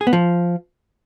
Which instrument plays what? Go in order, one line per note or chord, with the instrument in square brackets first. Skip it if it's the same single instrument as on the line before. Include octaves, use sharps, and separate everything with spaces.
[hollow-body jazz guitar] G#4
B3
F3